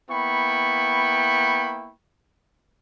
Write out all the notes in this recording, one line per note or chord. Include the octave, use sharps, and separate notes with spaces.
A#3 B3 E4 G5 B5 C#6